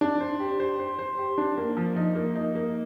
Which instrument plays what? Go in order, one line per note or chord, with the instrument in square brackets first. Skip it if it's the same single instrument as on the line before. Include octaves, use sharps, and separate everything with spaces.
[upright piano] D4
C5
G4
C5
C5
C5
G4
D4
A#3
F3
D#4
A#3
D#4
A#3